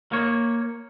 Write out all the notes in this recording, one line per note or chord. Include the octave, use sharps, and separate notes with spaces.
A#3 C#5